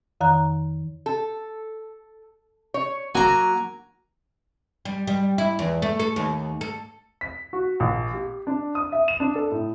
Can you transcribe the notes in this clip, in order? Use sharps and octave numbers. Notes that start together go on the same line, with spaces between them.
F2 D#3 A#5 F#6
A4
C#5
F#3 A#3 F#4 G#5 A#5
G3
G3
E4
E2
A3
A4
D#2
A4
B6
F#4
A#1
G4
D4
D#6
E5
E7
D4
A4
A2